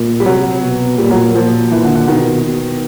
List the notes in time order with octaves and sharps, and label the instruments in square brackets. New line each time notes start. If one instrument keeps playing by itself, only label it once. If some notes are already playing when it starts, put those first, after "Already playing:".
Already playing: [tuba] A#2
[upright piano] G3
[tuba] C3 [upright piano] F#3
[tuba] B2
[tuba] A#2 [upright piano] G3
[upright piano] F#3
[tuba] A#2 [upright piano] F3
[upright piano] E3
D3
D3
[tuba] B2 [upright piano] D#3
[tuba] B2